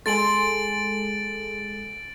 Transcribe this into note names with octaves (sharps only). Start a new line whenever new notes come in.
G#3 G#4 A4 G#5 C6 A6 D7 F#7